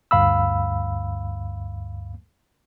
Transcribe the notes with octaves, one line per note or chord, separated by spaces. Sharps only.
D2 G2 F5 B5 E6